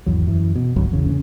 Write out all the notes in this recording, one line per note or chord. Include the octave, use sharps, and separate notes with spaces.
G#1 E2 F#3
F#2 E3
B2
G1 C2 F#3
A1 E2 C#3
C#3 A3 C#4